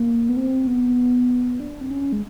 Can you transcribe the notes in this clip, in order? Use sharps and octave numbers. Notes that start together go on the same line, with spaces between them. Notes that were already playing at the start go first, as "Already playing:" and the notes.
Already playing: A#3
B3
C4
B3
D4
C4
C#4
G#3